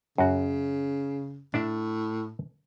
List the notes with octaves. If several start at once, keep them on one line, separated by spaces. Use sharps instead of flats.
F#2 C#3 F#4
A2 D4 D5 E5